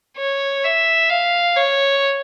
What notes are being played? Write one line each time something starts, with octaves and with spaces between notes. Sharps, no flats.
C#5
E5
F5
C#5